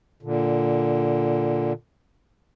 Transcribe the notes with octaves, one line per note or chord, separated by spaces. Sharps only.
A#2 D3